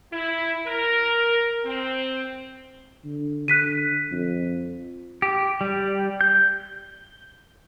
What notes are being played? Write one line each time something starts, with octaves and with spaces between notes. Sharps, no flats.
E4
A#4
C4
D3
D3 F#6 B6 D#7
F2
G4
G3
G6